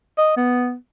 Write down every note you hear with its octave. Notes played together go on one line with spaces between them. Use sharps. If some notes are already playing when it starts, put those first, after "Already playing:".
D#5
B3